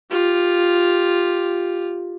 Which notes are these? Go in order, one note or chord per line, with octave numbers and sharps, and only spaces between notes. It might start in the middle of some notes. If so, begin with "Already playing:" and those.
F4 G4